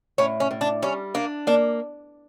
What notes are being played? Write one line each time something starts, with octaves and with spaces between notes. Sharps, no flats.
A2 C#4
C#4
A2
D4
G3 C#4
A#3 D4
A#3 D4